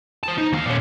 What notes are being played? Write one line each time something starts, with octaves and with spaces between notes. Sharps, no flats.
C5 A5
D#4
D#2 F5
A#2 C#4